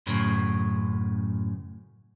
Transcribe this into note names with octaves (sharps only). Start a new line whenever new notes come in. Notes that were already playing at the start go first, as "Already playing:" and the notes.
F#2 A2 C#3